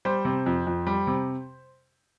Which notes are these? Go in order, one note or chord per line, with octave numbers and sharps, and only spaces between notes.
G3 C5
C3
F2
F2
G3
C3